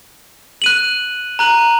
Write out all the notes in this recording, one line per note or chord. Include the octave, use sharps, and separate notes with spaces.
F#6 D#7 F#7
A#5 F#6 D#7 F#7